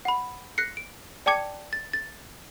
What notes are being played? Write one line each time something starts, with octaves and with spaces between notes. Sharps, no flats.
F#5 B5
F#6 A#6 C7 C#7
D7
D5 G5 A5 D6 G#6 C#7
A6
A6